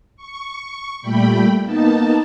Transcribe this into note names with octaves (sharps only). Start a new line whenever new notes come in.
C#6
A#2 G3 A3 G5 B5
A#3 B3 D#4 A5